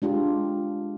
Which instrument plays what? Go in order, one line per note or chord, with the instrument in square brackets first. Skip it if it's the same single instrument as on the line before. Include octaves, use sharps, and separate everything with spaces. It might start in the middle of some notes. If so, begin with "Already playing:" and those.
[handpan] G#3 D4 F4 G4